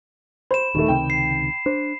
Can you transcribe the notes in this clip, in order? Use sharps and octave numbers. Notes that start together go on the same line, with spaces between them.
C5 B5 E7
D#1 D#3 A3
C#2 C3 D#3 G5
C7
D4 C5